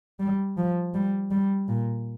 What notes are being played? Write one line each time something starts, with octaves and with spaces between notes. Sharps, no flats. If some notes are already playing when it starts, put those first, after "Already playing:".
G3
F3
G3
G3
A#2